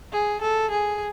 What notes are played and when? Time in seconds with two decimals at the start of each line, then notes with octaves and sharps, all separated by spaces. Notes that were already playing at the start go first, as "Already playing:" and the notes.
0.13 G#4
0.42 A4
0.71 G#4